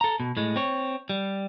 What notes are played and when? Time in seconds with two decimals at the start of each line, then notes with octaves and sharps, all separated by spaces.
0.01 A4 A#5
0.20 B2
0.37 A2 G#3
0.56 C4 C#5
1.10 G3